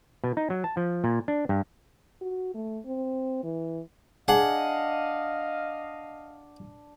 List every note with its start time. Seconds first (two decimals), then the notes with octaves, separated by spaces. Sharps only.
0.24 B2
0.37 D#4
0.50 F#3
0.64 A5
0.77 F3
1.04 A#2
1.28 D4
1.49 G2
2.21 F#4
2.54 A3
2.86 C4
3.43 E3
4.28 D4 G#4 D#5 F5 F#5